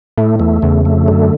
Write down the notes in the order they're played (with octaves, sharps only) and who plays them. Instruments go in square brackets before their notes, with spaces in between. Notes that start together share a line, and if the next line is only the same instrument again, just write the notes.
[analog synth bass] A2 [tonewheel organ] A3
[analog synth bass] E2 [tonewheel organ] A3
[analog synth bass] E2 [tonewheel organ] C#3
[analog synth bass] F2 [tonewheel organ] A3
[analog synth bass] F#2 [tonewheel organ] D3